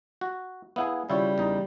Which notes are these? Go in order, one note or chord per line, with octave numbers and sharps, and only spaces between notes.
F#4
B3 E4 G#4 F5 F#5 G#5
C#3 G3 E4 F4 C#5
E2 D#4